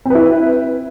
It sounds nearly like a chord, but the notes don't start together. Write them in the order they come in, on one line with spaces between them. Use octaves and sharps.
C4 B4 E4